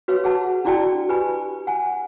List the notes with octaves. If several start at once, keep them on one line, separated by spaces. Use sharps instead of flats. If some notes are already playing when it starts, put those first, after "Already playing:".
F#4 B4 C#5 F5
G#4 F#5 A5
D4 E4 F#4 D5 G5 A5
G4 B4 G#5 B5
F#5 G#5